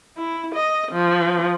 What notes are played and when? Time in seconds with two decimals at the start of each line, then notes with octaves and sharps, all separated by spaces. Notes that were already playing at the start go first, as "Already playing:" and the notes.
0.17 E4
0.55 D#5
0.92 F3